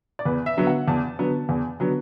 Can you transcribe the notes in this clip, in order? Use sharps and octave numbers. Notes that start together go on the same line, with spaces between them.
D5
E2 B4
E5
D3 F#3 B3
F#5
E2 A5
D3 F#3 B3
E2
D3 F#3 B3